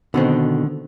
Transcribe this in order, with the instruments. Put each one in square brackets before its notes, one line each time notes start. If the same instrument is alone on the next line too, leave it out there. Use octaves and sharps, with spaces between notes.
[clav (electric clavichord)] B2 B3 [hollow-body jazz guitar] D3 D#3 C4